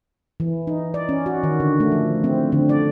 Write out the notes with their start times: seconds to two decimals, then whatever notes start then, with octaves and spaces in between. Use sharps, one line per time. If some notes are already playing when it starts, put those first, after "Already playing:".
0.40 E3
0.67 D#4
0.94 D5
1.09 C#4
1.26 F#4
1.43 D#3
1.60 D3
1.80 A3
1.92 F3
2.24 C4
2.52 D3
2.69 D5